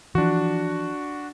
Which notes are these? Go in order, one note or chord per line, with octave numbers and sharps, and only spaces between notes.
E3 F3 D4 F#4